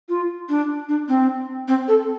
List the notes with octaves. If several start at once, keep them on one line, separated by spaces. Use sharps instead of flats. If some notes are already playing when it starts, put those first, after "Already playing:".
F4
D4
D4
C4
C4
A4